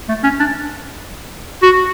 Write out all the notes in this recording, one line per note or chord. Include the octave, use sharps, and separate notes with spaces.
A3
C#4
D4
F#4